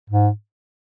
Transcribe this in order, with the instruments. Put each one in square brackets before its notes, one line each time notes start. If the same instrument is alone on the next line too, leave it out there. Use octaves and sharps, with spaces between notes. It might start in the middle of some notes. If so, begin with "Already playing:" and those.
[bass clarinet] G#2